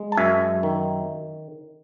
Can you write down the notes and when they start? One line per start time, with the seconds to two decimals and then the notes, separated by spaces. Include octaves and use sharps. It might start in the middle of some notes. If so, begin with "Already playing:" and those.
Already playing: G#3
0.12 A5
0.17 F#2 E5 G#5
0.63 D#3